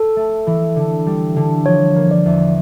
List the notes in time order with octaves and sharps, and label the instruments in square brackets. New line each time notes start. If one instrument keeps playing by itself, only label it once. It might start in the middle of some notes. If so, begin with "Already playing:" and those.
Already playing: [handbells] A4
[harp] A3
E3
D3
G3
D3
[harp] F3 [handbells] C#5
[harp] A#3
[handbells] D5
[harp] E2